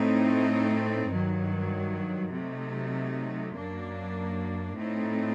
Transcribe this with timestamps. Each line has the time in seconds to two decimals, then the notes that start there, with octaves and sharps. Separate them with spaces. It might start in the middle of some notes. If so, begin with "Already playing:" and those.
Already playing: A2 A3 C4 D#4
1.10 G2 D#3 F#3
2.32 C3 F#3 A3 D#4
3.56 F#2 F#3 A#3 D4
4.77 A2 A3 C4 D#4